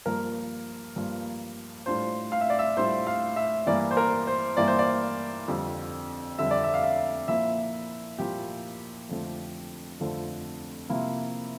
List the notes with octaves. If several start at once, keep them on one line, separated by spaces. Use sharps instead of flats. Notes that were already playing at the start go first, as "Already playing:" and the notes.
G2 F3 A#3 A#4
G2 F3 A#3
A2 G3 D4 F4 C5
F5
E5
D5
E5
A2 G3 D4 F4 C5
F5
E5
G2 E3 A#3 E4 D5
C5
A#4
C5
G2 E3 A#3 E4 D5
C5
D5
F2 D3 G3
F2 D3 G3 E5
D5
E5
F5
E5
A#2 F3 A#3 E4 E5
A#2 F3 A#3 E4 G4
F2 D3 F3 A3
F2 D3 F3 A3
C3 F3 A#3 E4